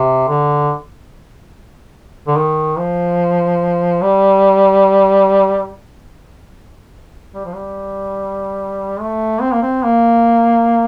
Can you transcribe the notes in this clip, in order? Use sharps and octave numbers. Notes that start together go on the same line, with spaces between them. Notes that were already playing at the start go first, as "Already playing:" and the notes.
Already playing: C3
D3
D3
D#3
F3
G3
G3
F3
G3
A3
C4
A#3
C4
A#3